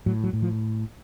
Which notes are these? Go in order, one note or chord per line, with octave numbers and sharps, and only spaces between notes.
A2 F#3
F#3
A2
F3